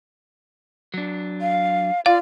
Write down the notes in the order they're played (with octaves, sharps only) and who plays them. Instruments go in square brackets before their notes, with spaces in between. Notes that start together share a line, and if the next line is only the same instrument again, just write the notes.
[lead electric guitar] F#3 D4
[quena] F5
[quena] F4 [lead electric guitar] D5 [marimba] F5